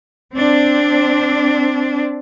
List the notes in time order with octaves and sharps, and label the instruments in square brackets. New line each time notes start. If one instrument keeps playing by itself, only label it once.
[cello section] C4 D4